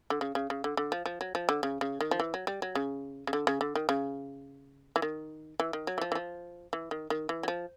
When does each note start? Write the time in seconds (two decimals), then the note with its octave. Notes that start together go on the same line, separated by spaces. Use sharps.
0.10 D3
0.21 C#3
0.35 C#3
0.50 C#3
0.64 D3
0.77 D3
0.92 F3
1.06 F3
1.21 F#3
1.35 F3
1.49 D3
1.63 C#3
1.81 C#3
2.01 D#3
2.11 F3
2.20 E3
2.34 F#3
2.47 G3
2.62 F#3
2.75 C#3
3.27 C#3
3.33 D3
3.47 C#3
3.61 D3
3.75 D#3
3.89 C#3
4.96 E3
5.02 D#3
5.60 E3
5.73 D#3
5.87 F#3
5.98 E3
6.01 F3
6.12 E3
6.15 F3
6.73 E3
6.91 D#3
7.10 D#3
7.29 E3
7.43 F#3
7.48 F3